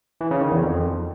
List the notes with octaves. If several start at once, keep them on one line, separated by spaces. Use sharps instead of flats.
E3
C#3
D#3
E2
F2